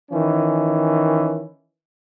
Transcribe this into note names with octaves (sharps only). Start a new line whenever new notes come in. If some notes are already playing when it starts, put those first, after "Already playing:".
D#3 E3 C#4